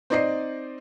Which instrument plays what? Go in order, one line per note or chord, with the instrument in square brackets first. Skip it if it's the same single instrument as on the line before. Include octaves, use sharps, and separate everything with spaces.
[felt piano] C4 D#4 D5 D#5 C7